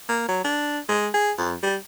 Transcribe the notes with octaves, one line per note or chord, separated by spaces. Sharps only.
A#3
F#3
D4
G#3
G#4
F2
G3